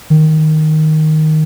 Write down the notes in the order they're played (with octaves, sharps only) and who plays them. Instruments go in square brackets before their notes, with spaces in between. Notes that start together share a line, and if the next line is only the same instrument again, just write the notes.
[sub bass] D#3